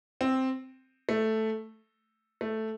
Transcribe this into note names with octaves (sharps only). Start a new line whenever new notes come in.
C4
A3
A3